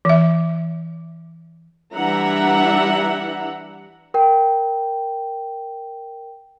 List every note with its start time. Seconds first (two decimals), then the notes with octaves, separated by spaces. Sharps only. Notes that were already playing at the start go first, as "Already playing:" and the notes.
0.05 E3 E5
1.94 E3 G3 D4 E5 F#5 A#5
4.14 A#4 G5